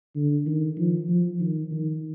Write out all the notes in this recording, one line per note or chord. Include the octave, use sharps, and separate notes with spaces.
D3
D#3
F3
F3
D#3
D#3